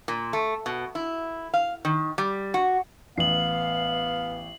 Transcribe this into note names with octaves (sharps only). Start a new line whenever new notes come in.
A#2
A3
B2
E4
F5
D#3
G3
F#4
A1 B3 F5 C7 F#7